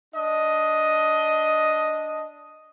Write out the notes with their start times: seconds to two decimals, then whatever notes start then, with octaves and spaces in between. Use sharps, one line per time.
0.14 D4 D#5